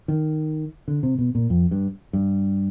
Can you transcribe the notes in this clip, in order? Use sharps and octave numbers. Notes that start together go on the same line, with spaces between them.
D#3
D3
C3
B2
A#2
F2
G2
G2